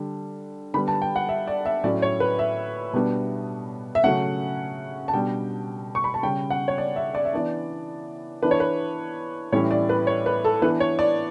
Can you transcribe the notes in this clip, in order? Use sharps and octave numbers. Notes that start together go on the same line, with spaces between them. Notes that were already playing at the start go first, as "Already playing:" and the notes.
Already playing: D3 G3 D4
D3 G3 B3 B5
A5
G5
F#5
E5
D5
E5
A2 F#3 C#4 D5
C#5
B4
E5
B2 G3 B3 D4
E5
C#3 F#3 A3 C#4 F#5
A5
B2 G3 D4 G5
C#6
B5
A5
C#3 G3 C#4 G5
F#5
C#5
D5
E5
D5
E5
E3 B3 D4 D5
E3 B3 D4 B4
C#5
B4
A2 E3 G3 C#4 C#5
D5
B4
C#5
B4
A4
E3 B3 D4 B4
C#5
D5